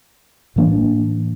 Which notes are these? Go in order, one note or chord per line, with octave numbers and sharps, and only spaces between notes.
A2 E3 A#3 D4